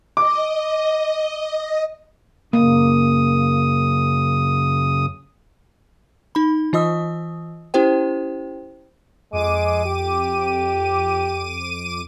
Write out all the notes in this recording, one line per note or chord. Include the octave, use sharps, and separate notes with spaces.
D#5 D6
F#2 C#3 A#3 D#6
D#4 B5
E3 F4 D#5 D#6 E6
C#4 E4 G4 C5 G5
F2 G#3 D6 D#7
G4